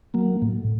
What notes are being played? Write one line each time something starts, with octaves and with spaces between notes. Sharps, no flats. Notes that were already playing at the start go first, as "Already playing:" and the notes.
F#3 A#3
A2